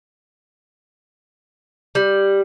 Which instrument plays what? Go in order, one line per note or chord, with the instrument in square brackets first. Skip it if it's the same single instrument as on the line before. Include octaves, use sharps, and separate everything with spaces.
[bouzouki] G3